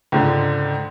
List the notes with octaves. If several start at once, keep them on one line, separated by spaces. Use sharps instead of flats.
C#2 G#2 D3